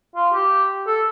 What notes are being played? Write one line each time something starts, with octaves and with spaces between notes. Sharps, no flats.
F4
G4
A4